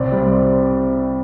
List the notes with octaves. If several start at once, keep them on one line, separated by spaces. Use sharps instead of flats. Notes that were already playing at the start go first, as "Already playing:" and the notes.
Already playing: C2 C4 D5
G3
C4